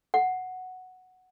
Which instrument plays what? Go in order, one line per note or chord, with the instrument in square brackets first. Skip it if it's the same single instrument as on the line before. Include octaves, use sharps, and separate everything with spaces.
[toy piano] F#5